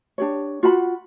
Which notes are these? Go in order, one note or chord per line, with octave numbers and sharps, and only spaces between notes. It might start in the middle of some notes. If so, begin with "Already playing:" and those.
D4 G4 C#5
F4 F#4 F#5 B5